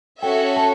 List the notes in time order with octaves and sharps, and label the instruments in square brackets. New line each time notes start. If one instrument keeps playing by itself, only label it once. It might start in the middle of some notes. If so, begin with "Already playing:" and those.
[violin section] C#4 F#4 A4 C#5 E5 [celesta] G5
[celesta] A5